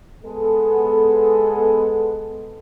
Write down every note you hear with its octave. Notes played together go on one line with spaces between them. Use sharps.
G#3 B3 A4